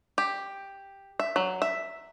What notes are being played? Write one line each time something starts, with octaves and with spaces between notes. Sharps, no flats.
G4
E5
F#3
E5